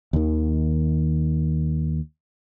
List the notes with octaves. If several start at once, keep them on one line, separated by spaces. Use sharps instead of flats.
D#2 D#3